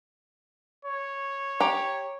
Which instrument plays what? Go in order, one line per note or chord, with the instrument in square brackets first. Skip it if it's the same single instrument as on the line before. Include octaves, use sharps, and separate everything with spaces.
[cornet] C#5
[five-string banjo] G4 A#5